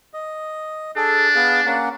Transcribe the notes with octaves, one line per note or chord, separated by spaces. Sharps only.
D#5
D4 G#4 A4
B3 G#4 F5
A#3 C#4 F#5